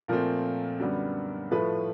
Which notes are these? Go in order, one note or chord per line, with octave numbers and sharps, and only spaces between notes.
A#2 F3 A3 C4 A#4
F#2 D3 G3 B3
A2 F3 A3 B4